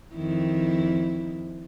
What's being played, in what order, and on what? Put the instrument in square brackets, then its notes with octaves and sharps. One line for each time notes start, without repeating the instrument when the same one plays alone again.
[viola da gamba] F2 D#3 E4